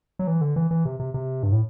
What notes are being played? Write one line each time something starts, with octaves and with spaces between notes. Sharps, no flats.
F#3
E3
D3
E3
E3
C3
C3
C3
G2
A2